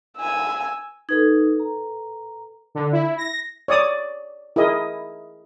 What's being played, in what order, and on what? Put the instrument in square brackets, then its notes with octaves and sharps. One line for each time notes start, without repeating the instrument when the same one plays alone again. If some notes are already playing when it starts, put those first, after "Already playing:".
[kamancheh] G#5 E6
[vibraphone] D#4 [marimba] A4 B4 G#6
[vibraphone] A#5
[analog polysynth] D3
E4
A#6
[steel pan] C#5 D5 D#6
E4 G#4 A#4 D#5